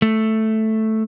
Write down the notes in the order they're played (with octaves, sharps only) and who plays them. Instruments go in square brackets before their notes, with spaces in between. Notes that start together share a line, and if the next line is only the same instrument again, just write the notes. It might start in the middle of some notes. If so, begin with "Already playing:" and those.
[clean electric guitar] A3